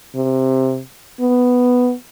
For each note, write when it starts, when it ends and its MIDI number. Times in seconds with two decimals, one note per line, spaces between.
0.15 0.81 48
1.21 1.93 59